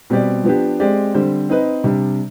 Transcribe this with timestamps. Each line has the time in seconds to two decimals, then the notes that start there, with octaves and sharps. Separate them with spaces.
0.10 B2 G3 C4 G4 D5
0.44 F3 B3 D4 G4
0.80 G#3 C4 G4 D5
1.14 D3 G3 C4 G4 C5
1.49 C4 D#4 B4 D#5
1.84 C3 G3 D4